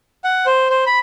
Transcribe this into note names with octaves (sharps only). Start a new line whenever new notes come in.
F#5
C5
C5
B5